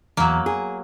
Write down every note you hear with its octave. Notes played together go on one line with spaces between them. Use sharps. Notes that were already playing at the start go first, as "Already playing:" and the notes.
E2 F#3 A#3
G#4